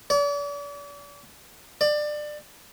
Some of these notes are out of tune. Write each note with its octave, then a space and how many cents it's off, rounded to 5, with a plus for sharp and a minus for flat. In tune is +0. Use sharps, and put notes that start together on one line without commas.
D5 -40
D5 +25